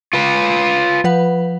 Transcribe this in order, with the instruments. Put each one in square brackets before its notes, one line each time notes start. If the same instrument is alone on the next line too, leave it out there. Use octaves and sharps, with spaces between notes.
[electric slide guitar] F4 B4
[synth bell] F3 B4 F#5